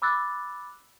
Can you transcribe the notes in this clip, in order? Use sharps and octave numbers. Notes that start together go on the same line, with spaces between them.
B5 D6 E6 F#6 A6